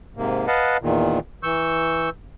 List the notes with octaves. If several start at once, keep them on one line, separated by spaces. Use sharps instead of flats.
G#2 C3 A#3
B4 D#5 F5 F#5 A5
E2 A#2 D#3
E3 C#6 E6 G6